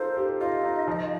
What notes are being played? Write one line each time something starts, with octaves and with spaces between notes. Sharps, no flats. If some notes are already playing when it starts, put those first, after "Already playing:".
Already playing: D#4 F4 A4 A#4 C5
G4
F4 D#5
D#4
F3